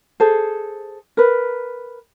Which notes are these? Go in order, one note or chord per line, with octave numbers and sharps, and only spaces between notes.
G#4 A4 C5
A#4 B4